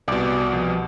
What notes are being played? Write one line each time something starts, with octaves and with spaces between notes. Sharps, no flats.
C2 B2 D5
F3